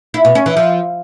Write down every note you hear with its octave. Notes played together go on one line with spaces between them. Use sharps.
E4
B2
C#4
E3
F3